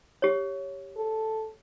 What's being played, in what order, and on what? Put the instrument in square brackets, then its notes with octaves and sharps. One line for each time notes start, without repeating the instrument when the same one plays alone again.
[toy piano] G4 C#5
[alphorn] A4